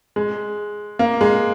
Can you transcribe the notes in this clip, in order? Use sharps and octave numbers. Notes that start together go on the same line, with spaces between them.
G#3
A#3
G#3